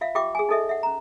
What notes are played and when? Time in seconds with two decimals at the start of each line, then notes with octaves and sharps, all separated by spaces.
0.01 F4 E5 F5
0.15 F4 G4 E5 G5 D6
0.35 G#4 G#5
0.49 D#4 G#4 A4 D#5 E5
0.69 E5 F#5
0.83 C#4 A#5